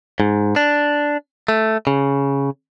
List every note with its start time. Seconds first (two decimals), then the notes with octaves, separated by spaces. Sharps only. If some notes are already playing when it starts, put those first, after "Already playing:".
0.20 G#2
0.56 D4
1.48 A3
1.87 C#3